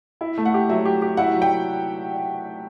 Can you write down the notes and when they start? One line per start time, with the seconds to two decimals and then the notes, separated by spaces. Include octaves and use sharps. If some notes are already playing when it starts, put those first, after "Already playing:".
0.21 E4
0.38 A3
0.45 F#5
0.54 G4
0.69 F#3 E5
0.85 G4
1.02 G4
1.17 E4 F#5
1.34 F#3
1.42 G5